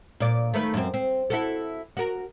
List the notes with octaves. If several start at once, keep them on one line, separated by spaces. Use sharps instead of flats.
A#2 D5
D#3 A3 B4
F#2 C4
C4
E4 F#4 A4
F#4 A#4